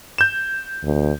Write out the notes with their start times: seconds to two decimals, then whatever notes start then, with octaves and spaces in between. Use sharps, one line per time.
0.18 G6 E7
0.83 D2